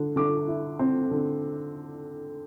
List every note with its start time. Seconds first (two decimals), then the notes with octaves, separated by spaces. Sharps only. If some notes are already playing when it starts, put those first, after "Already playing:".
Already playing: D3
0.16 D3 D6
0.48 E4
0.79 C4
1.11 D3